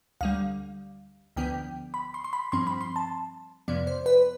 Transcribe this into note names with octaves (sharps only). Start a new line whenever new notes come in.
D2 D3 G3 F5
D2 D3 F3 B3 G5
B5
C6
C6
B5
G2 F3 C4 C6
B5
C6
A5
F2 C3 F3 B3 D5
C5
B4